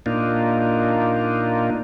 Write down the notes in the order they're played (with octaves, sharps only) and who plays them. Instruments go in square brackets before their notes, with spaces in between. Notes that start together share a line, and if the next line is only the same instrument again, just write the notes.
[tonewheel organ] A#2 A#3 D4 D#4 F4